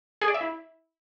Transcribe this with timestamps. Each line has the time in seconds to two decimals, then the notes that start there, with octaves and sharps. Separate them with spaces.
0.21 G#4
0.28 D5
0.34 E5
0.41 E4